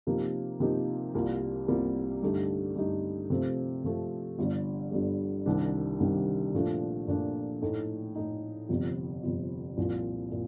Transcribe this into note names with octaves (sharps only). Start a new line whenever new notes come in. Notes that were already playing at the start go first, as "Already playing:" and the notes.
C3 F3 A#3 D#4 G4
C3 F3 A#3 D#4 G4
C2 C3 G3 A#3 F4
C2 C3 G3 A#3 F4
G2 D3 A3 D#4 G4
G2 D3 A3 D#4 G4
C3 F3 A3 C4
C3 F3 A3 C4
G1 G2 D3 G3
G1 G2 D3 G3
C2 C3 D#3 G3 D4
C2 C3 D#3 G3 D4
A#2 F3 A3 D4
A#2 F3 A3 D4
A2 A3 D#4
A2 A3 D#4
G1 F2 C3
G1 F2 C3
C2 A#2 F3
A#2